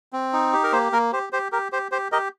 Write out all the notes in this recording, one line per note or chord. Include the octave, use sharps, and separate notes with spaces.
C4
D#4
G4
A#4
A#3 C5
A#3 A#4
G4 C5
G4 C5
G4 A#4
G4 C5
G4 C5
G4 A#4 D#5